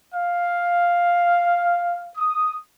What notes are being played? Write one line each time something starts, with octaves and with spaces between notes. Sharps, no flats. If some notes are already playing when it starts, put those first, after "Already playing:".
F5
D#6